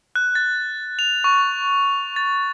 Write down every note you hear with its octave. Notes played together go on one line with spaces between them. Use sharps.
F#6
A6
F7
C#6
A6